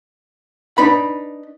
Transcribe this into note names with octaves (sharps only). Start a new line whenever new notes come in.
D4 D#4 B4 B5